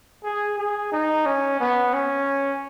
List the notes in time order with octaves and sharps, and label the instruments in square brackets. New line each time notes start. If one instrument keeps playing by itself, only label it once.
[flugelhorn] G#4
G#4
D#4
C#4
B3
C#4